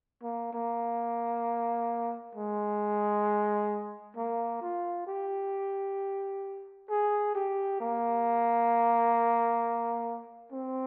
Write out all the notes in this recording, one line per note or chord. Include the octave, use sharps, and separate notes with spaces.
A#3
A#3
G#3
A#3
F4
G4
G#4
G4
A#3
C4